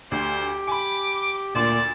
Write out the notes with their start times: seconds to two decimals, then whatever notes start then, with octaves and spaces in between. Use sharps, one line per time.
0.12 D2 G4 C5
0.67 G#5 B5 D6
1.55 D2 A#2 D5 A5 C6